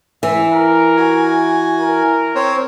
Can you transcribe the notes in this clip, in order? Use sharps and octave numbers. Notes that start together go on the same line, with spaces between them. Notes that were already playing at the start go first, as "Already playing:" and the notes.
E3 E5
A#4
F#4 G#5
A#4
C4 C5 C#5